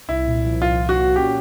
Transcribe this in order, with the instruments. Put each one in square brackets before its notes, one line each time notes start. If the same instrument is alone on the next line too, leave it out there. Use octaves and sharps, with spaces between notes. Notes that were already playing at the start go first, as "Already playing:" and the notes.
[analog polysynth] C2 [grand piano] E4
[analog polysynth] A#2
F3
[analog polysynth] C2 [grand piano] F4
[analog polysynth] A#2
[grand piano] F#4
[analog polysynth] A#2
[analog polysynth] C#4 [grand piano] G4